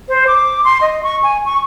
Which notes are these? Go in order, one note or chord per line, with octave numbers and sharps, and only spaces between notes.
C5
D6
C6
D#5
C#6
G#5
C#6